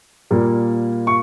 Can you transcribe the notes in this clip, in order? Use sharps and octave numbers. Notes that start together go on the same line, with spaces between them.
A#2 G3 A#3
C#6